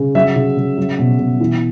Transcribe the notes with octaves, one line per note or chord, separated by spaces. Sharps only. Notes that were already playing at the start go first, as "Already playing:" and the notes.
Already playing: C#3
F#3 E5
C#3
C#3
F#3
B2
B2
E3